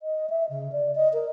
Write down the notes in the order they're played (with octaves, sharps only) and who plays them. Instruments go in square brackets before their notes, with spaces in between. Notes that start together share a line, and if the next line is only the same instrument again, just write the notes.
[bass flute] D#5
E5
C#3
D5
D#5
A#4